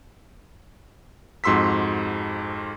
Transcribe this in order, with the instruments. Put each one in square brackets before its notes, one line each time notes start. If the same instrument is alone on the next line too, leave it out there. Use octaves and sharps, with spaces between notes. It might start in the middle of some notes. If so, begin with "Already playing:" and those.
[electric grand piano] F2 G#2 F#4 C6 E6 B6